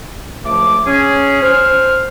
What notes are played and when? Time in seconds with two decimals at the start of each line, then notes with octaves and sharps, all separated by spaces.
0.45 C#2 F3 A3 D6
0.86 C#4 G#4
1.41 C5 F6